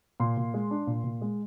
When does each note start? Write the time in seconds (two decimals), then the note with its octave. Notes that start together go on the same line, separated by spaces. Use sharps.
0.20 A#2 C6
0.37 A#2
0.54 G#3
0.71 D4
0.87 A#2
1.04 A#2
1.21 G#3